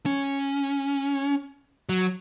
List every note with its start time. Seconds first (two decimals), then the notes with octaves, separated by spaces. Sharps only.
0.06 C#4
1.89 F#3